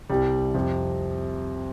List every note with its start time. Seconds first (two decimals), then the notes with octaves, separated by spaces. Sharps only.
0.10 C2 C3 G3
0.54 F2 C3